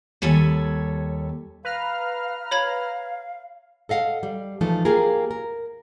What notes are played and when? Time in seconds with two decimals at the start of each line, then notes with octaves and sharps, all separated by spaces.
0.22 D#2 G3 A4 C#5 G#5
1.65 B4 F5 A#5 F6
2.51 C#5 F5 B5 G#6
3.89 A4 D#5 F5 F#5
4.23 G3
4.61 E3 F3 A3 D#4
4.85 A#3 F4 G4 G#4 A#4
5.31 A#4